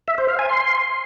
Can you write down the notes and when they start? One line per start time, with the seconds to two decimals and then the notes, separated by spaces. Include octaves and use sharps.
0.08 E5
0.18 C5
0.28 F5
0.39 G#5
0.49 C6